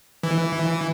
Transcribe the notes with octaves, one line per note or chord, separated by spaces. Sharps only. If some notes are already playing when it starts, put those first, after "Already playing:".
E3